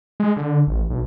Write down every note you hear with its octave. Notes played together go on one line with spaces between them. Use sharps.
G#3
D3
A1
B1